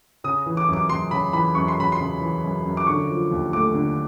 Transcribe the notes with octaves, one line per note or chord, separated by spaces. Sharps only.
C#3 D#6
E3
D6
F#2 D6
F#2 C6
C#3 B5
E3 B5
F#2 C#6
C6
F#2 B5
C6
C#3
E3
F#2
F#2
D6
D3 C#6
F3
D#2
A3 D6
D3